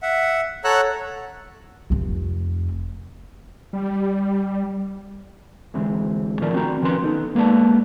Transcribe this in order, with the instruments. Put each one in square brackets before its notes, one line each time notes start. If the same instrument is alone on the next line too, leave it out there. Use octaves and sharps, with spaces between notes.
[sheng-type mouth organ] E5 F#5
A4 C#5 F#5 A#5 E6 F#6
[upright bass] F1 C4
[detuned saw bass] G3
[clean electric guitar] D2 E3 G#3 C4
A2 D#3 F3 A3 A#4 D5
C4 F#4 A#5
D#3 F3 C#4 B4 C6
B3 D#4 A4
G#3 A#3 B3 D5 A5